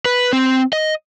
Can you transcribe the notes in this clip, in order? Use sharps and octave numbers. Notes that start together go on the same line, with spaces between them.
B4
C4
D#5